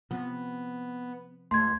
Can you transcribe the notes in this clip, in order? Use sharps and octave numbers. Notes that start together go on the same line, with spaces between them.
C3 F3 B3
C#2 A3 C6 G#6